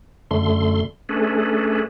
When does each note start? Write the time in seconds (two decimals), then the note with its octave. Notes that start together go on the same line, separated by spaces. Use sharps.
0.31 F#2 D3 A3 C6
1.09 A3 C#4 D4 G#4 A4 B4